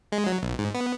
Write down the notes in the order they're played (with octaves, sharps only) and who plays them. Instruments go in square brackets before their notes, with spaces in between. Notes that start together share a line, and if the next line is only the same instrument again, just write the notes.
[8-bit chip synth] G#3
F#3
B1
G#2
B3